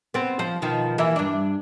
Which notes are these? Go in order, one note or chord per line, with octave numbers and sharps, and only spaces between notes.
B3 C4
F3 C5
B2 D#3 F3
E3 A#3 E5
G2 D4